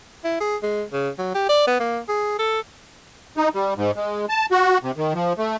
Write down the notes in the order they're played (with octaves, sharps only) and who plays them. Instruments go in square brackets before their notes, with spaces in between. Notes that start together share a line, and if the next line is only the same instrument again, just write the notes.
[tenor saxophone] E4
G#4
G#3
C#3
F#3
G4
D5
B3
A#3
G#4
A4
[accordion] D#4
G3
G#2
G#3
A5
F#4
C3
D#3
F3
A3